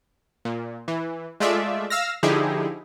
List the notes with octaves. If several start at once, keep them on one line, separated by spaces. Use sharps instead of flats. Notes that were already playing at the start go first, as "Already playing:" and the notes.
A#2
E3
G#3 A3 F4 D5 E5
F5 E6 F6 A#6
D3 F3 D#4 E4 G4 G#4